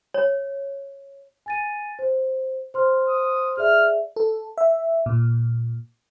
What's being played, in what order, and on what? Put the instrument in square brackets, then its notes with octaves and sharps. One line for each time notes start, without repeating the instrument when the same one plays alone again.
[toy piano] C#5
[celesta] G#5 A6 D#7
C5
C5 C6 F6
[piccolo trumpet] D#6
[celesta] G#4 D5 E5 [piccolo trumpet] F6
[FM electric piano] A4
E5
A#2